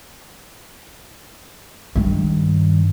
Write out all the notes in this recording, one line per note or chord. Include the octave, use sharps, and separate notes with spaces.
G2 D#3